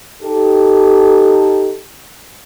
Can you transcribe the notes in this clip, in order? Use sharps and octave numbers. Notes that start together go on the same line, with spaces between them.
D#4 G4 A4